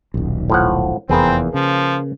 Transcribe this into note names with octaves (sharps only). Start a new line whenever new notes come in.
D#1 B1
A2 F3 F#5
F1 E2 A#3 C4 G#4 B4
C#3 F3